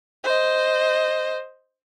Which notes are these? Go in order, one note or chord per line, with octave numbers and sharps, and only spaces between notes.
C5 D#5